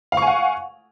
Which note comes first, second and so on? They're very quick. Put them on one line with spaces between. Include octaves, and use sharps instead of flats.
F5 C#6 G#5 F#5